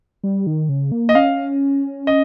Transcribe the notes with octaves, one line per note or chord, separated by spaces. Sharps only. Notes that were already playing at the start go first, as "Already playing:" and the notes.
G3
D#3
C#3
A#3
D#5
C#4 F5
D#5